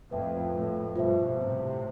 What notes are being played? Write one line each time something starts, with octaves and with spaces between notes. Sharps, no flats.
F2 A2 B4 E5 G5
F2 A2
G2 B2 F4 C5 E5
A2 C3